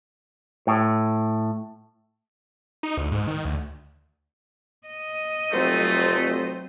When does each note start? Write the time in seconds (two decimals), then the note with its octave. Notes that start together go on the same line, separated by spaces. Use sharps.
0.67 A2
2.83 D#4
2.97 D2
3.12 G#2
3.27 D#3
3.45 D2
4.87 D#5
5.52 F1 F#3 A3 C4 C5